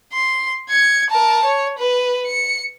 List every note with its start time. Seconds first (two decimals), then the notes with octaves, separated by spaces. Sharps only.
0.13 C6
0.70 G#6 C#7
1.10 A#4 A5
1.45 C#5
1.78 B4
2.26 C#7